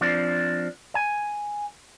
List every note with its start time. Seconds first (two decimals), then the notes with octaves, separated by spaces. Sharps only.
0.01 F3 C4 D4
0.95 G#5